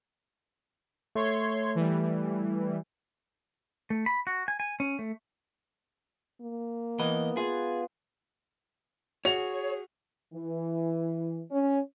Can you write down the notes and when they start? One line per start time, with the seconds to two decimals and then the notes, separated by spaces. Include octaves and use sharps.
1.16 A3 C#5 C6 G#6
1.75 E3 G3
3.90 A3
4.06 B5
4.27 F#4
4.48 G#5
4.60 G#5
4.80 C#4
4.99 A3
6.42 A#3
6.99 E3 B3 D#5
7.37 F4 G#4
9.25 F#4 G#4 C#5 F7
10.34 E3
11.51 C#4